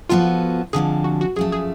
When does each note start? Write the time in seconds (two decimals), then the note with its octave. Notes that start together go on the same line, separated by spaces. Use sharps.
0.09 F3 B3 F4 F#4 A4
0.73 F2 D3 F3 G#3 G#4
1.04 F#4
1.21 F#4
1.36 F#2 F3 A3 G#4
1.52 G#4